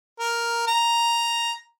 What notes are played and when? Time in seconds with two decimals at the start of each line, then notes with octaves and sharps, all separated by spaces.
0.20 A#4
0.67 A#5